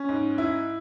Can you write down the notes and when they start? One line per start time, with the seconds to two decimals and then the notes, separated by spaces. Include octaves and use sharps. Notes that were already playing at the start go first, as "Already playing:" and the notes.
Already playing: C#4
0.09 G#2
0.38 E4